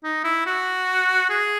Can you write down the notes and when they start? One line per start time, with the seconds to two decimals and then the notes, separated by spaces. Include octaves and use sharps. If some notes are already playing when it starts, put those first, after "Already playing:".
0.04 D#4
0.24 E4
0.46 F#4
1.30 G#4